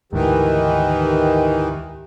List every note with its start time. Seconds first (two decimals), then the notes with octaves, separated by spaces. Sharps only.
0.13 D2 G#2 D#3 E3 G4